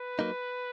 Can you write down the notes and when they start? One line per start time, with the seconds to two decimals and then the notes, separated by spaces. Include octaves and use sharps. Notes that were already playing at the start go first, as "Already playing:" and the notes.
Already playing: B4
0.19 F#3 A#3 D#4